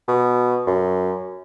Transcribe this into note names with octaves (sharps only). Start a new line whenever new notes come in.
B2
F#2